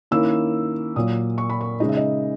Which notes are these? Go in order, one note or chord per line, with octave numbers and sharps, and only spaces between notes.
D#3 A#3 C#4 E4 E6
A#2 F#3 A#3 D#6
C#6
B5
C#6
C#3 G#3 D#4 D#5
E5
D#5